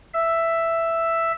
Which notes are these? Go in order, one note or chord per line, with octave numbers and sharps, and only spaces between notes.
E5